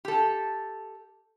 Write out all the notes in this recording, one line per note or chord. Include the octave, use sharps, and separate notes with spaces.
G4 A4